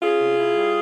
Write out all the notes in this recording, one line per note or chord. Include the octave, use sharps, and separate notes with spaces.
C#4 F4 G#4
C3
E4
G3